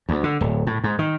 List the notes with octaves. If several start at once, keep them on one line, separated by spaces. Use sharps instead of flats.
D2
D3
D1
A2
G#2
D#3